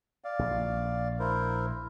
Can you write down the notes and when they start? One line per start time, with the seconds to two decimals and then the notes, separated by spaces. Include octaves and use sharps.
0.24 D5 F5
0.39 A#1
1.19 E4 A#4 C5